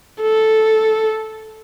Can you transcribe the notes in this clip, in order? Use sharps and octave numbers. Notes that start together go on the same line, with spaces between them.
A4